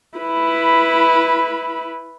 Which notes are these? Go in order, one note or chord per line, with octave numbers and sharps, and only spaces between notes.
E4 B4